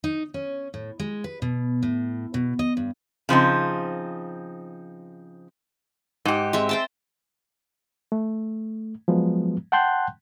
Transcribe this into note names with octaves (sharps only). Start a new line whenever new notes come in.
D#4
C#4
A2
G#3
B4
B2
A2
B2
D#5
G2
C#3 F3 C4 D#4
G#2 G4
G#3 C4 E5
C5 G5 A5
A3
F3 F#3 G#3 B3
F#5 G5 A5 C6 F#6 G6